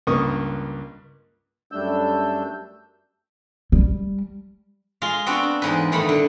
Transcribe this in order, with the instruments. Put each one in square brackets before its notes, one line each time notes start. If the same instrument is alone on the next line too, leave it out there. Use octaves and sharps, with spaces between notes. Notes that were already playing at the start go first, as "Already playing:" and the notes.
[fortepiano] C#2 G2 A#3 C#6 D#6
[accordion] F#2 G3 A3 D4 E6 G6
[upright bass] G3
[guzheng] G#3 F4 C6
B3 C4 D4 F4 F#4
E2 G#2 B4
G2 D#3 A3 E4 B5
D3